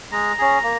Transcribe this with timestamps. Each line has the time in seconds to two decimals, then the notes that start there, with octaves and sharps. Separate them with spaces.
0.12 G#3 A#5
0.38 C#4 G#4
0.63 A#3